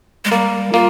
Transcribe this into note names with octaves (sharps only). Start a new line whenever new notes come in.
G#3
G3 A#3
A#3 F4